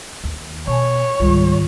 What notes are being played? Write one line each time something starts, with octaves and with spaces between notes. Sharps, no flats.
D#2
B2 C#5 G#5 A5 C#6
C#2 G#2 D#3 G3 F4